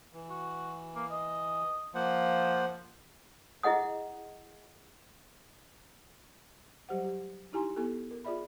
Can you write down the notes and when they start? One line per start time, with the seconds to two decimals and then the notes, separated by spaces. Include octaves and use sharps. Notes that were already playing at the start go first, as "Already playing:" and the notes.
0.14 E3
0.30 F#4
0.95 A#3
1.11 D#5
1.95 F3 A#3 C5 F#5
3.63 E4 G#4 D#5 F#5 D#6
6.89 F#3 G3 G4 C5 F#5
7.04 G4
7.52 D#4 E4 G4 G#5 A#5 C6
7.76 B3 E4 G4 A4
8.11 A#4
8.25 F4 G#4 D5 E5 B5